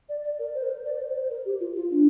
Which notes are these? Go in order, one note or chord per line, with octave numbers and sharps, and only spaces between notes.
D5
D5
A#4
C5
A#4
C5
D5
C5
C5
A#4
G4
F4
F4
D4